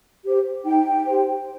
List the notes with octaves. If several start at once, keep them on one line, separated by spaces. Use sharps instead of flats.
G4 C5
D#4 G5
G4 C5